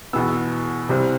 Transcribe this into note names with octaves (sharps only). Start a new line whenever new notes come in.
E2 B2 B3 E6
C2 C3 G3 C4